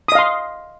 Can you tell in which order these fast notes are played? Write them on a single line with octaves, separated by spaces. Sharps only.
D#6 D#5 F5 C6